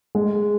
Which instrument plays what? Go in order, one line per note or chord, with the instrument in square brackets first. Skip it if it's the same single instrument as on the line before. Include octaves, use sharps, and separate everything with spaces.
[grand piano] G#3